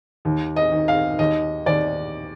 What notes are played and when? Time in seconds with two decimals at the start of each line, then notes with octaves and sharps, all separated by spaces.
0.25 D#2
0.56 D#5
0.71 D#3
0.88 F5
1.19 D#2 D#5
1.66 D#2 D5